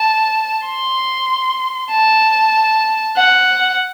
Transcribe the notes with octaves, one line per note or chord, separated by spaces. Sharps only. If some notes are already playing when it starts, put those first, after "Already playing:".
Already playing: A5
C6
A5
F#5